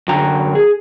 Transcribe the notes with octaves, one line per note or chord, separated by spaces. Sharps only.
F#2 D3 F#4 G5 A#5
G#4